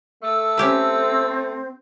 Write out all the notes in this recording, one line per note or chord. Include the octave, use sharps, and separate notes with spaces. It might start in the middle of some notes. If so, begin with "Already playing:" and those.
A3 E6
C4 C#4 G4 B4